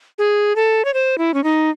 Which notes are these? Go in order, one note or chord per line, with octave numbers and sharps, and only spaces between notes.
G#4
A4
C#5
C5
E4
C#4
D#4